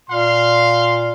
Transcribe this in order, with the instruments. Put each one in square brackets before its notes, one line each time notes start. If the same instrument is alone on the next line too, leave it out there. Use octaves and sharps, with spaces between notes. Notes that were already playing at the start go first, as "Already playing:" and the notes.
[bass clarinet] A#2 [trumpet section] F5 C6